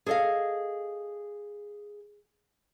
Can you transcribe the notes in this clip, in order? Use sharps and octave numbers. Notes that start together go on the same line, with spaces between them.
G#4 A4 D5 D#5 F5